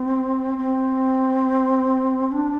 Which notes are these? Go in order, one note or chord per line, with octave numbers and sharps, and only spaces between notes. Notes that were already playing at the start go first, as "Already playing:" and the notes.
Already playing: C4
C4
D4